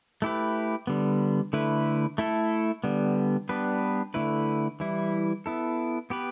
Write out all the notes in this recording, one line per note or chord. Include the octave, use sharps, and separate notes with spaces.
A3 E4 G4 B4
D3 G3 B3
D3 A3 E4 B4
A3 E4 A4
D3 G3 B3
G3 B3 D4 B4
D3 A3 E4 B4
E3 G3 E4
B3 E4 A4
B3 G4 B4